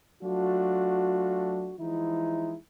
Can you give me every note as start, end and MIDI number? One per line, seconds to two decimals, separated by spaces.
0.23 1.74 54
0.23 1.74 57
0.23 1.74 62
0.23 1.74 65
0.23 1.74 66
1.80 2.55 52
1.80 2.55 53
1.80 2.55 56
1.80 2.55 63
1.80 2.55 64